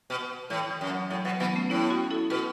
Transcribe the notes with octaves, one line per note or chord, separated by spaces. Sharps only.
B2
A2 E3
E3
F#2
F#3
A2 F#3
B2 F#3
B2 E3 F#3 B3
A3 C#4
A2 B3 E4
C#4 F#4
E4 A4
B2 F#4 B4